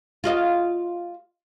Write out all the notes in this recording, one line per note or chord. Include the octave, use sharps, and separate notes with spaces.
F4 F#4 D#5